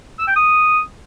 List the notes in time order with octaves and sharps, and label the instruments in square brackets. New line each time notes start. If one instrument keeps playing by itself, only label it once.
[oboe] E6
G5
D#6